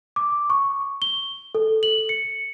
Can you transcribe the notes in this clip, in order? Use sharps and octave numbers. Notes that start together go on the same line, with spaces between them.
D6
C#6
G7
A4
F#7
C#7